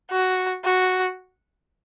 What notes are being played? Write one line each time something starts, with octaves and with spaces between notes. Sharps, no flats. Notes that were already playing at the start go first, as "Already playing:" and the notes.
F#4
F#4